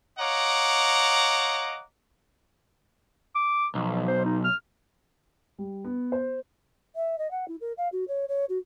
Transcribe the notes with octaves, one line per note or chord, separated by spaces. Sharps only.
C#5 D#5 F5 F#5 A#5 D6
D6
B1 F3
C5
D#4
F6
G3
B3
C5
E5
D#5
F#5
E4
A#4
F5
F#4
C#5
C#5
F#4